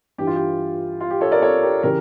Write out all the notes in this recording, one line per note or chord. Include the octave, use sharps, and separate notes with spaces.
G2 E3 G4
F4
G4
F4
G4
A4 C#5
A#4 D5
A4 C#5
G4 A#4
C#3 E3 G4 A#4